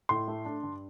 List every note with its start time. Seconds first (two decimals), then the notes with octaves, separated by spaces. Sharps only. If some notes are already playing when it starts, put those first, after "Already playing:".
0.09 A2 C6
0.28 A3
0.45 D4
0.63 G2